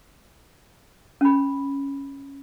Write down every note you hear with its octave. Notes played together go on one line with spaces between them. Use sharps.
C#4 B5